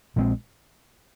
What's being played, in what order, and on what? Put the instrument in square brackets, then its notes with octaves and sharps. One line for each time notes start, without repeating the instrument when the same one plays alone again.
[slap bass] A#1 A#2 G#3 C4